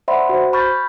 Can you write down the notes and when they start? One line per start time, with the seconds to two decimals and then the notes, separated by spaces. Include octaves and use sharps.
0.08 C5 D5 E5 F#5 B5 C6
0.29 F#4 C5
0.53 B5 C#6 F6 G6 A6